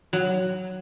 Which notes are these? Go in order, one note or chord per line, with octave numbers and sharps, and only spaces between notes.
F#3